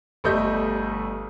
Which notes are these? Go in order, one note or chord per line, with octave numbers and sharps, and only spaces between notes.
G1 G3 A3 A4 D#5 G6